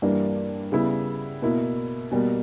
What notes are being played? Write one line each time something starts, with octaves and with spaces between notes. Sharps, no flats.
G2 E3 G3 A#3 D4
C#3 G3 B3 E4
B2 A#3 E4
B2 G3 A#3